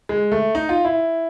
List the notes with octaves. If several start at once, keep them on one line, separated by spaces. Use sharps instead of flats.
G#3
A3
D#4
F4
E4